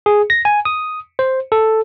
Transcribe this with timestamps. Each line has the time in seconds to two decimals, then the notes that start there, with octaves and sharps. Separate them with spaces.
0.06 G#4
0.30 A#6
0.45 G#5
0.65 D#6
1.19 C5
1.52 A4